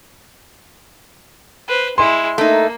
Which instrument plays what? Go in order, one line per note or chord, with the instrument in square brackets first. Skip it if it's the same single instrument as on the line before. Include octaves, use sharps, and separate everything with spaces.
[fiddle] B4 C5
[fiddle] G#3 E4 [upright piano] C6
[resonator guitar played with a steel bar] A3 D#4 [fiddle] A#3